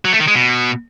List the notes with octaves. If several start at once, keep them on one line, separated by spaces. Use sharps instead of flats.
F#3
A3
D#3
G#3
B2